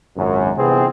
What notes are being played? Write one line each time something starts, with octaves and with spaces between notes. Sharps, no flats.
G#1 C#2 F#2
G1 C3 E3 B3 C4 G#4